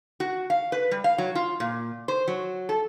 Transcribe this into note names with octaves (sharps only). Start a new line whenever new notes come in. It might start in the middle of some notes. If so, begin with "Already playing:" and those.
F#4
F5
B4
G3
F5
F#3
F4
A#2
C5
F#3
A4